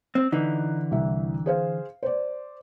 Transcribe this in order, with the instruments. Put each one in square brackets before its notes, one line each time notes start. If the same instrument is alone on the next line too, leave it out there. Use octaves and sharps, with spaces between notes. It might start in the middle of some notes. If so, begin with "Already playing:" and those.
[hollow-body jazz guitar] C4
[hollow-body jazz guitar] D3 E3 [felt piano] D#4
[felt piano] C2 E5
G#4 C5 F5
C5 D5